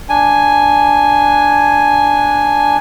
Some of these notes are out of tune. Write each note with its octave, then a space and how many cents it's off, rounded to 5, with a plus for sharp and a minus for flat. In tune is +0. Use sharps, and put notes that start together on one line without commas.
D4 +0 G#5 +0